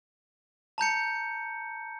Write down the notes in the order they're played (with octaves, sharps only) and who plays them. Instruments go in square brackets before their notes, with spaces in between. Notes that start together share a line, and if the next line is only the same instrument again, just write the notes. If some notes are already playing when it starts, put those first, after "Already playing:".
[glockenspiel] A5 A#5 G6 C#7